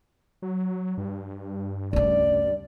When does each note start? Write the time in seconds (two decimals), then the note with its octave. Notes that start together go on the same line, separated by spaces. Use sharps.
0.42 F#3
0.98 G2
1.93 D2 C#3 D5